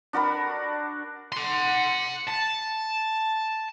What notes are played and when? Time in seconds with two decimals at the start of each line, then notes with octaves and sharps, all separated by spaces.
0.13 D4 F#4 A#4 B5
1.32 F#5 C6
2.28 A5